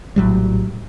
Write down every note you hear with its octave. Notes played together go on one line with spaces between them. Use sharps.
A#1 A2 F#3 G3